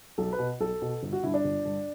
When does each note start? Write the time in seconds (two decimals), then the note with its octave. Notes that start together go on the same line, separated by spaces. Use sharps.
0.18 B1 A4
0.33 B4
0.39 B2
0.60 B1 A4
0.82 B2
1.03 G1
1.13 F#4
1.23 G2 D3 E4
1.34 D4
1.44 G1
1.65 G2 D3